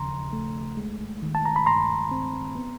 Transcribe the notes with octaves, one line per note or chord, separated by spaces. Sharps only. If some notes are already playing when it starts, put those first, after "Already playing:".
Already playing: D#2 C#3 F3 A#5 C6
A3
G#3
D#3
A5
A#5
B5
G2 A#5 C6
C4
B3